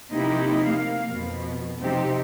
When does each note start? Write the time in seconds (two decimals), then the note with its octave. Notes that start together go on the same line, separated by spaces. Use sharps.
0.12 C3 F3 A#3 D#4 E4 G4
0.63 A#3 F5
1.08 F2 B2
1.81 C3 F3 C4 D#4 G4